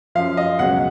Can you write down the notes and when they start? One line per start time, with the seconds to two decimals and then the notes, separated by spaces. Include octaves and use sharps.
0.15 F#2 F3 F5
0.37 D#5
0.59 C#2 B2 F#3 F#5